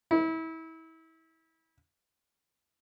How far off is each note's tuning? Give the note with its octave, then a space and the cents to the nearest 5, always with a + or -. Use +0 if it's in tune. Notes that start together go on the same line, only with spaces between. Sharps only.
E4 -30